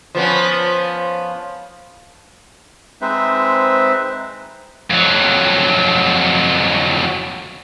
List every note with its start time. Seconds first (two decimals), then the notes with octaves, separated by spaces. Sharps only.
0.15 F3 B3 C#4
3.01 G#3 C4 D#4 B4 C5 E5
4.90 F2 F#3